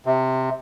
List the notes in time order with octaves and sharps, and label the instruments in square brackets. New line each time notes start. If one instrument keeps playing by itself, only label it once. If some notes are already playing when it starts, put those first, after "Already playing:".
[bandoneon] C3